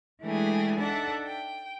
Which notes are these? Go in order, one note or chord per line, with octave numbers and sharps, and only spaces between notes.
E3 G#3 A3 D4 G4 G#4
D4 D#4 A4 D5 E5 F#5
G5